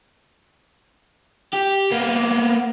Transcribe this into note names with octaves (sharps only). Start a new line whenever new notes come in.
G4
A#3 B3